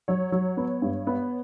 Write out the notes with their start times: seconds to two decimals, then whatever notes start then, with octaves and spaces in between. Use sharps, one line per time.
0.08 F#3 C#5
0.32 F#3
0.57 B3
0.82 G2
1.07 B3